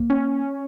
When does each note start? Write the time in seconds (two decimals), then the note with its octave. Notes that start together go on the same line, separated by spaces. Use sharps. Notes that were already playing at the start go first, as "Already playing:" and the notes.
Already playing: A#3
0.10 C#4